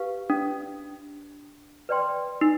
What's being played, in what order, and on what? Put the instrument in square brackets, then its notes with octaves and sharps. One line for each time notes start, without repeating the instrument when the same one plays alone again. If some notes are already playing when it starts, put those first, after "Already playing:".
Already playing: [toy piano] G4 B4 F5
[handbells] D4
[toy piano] B4 D5 G5 C6
[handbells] D#4